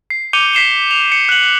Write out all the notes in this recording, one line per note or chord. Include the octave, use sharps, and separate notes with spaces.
C7
D6 G6 C#7 D#7 F7 G7
B6 C7 E7 G7
F7
C#7
F#6 F#7